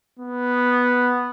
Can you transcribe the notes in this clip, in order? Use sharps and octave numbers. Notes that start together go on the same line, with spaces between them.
B3